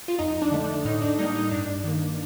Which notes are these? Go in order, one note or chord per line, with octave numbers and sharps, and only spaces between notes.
F4
F2 D#4
D4
D3 A3
D4
A2 D#4
D4
G3 A#3 D#4
D#4
G2 D4
D#3 A#3